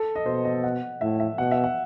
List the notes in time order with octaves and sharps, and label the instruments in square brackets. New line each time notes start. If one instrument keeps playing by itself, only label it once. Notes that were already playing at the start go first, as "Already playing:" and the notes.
Already playing: [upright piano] A4
D#5
[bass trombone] B2 [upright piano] C5
[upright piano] D#5
F#5
[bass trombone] A2 [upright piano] E5
[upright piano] E5
[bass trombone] B2 [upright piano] F#5
[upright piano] E5
F#5